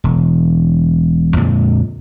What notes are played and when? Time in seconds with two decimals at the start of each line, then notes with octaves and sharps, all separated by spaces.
0.04 E1
1.36 F2 A#2 D3 G#3